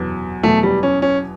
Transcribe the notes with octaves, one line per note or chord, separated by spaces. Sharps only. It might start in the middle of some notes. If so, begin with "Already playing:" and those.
Already playing: E2 B2 F#3 B3
E2 B2 F#3 A3 B3
G3
C#4
C#4